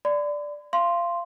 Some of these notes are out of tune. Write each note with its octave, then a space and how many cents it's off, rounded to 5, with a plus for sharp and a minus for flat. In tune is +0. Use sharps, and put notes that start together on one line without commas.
D5 +0 B5 +45
F5 -25 C6 +0